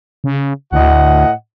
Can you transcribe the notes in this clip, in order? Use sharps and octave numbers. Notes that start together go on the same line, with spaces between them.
C#3
D2 A2 D#5 F#5